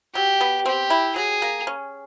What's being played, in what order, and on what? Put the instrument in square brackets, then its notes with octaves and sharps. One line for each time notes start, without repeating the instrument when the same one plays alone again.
[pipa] F#3 [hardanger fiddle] G4
[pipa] B3
[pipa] C4 [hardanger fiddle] G4
[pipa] E4
[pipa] F#3 [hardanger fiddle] G#4
[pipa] A#3
C#4